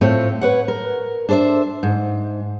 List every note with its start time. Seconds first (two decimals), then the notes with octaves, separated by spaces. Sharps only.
0.01 A2 A3 C4 F4 C#5
0.41 B4 C#5 F#5
0.68 A#4
1.29 D4 A4 C5 D5 E5
1.83 G#2